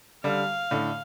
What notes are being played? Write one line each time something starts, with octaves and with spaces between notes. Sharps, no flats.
D3 G3 F5
A2 D3